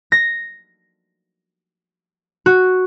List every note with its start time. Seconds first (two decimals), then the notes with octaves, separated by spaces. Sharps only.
0.12 A#6
2.46 F#4